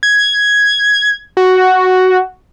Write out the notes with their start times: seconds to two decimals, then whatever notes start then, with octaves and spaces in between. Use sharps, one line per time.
0.03 G#6
1.37 F#4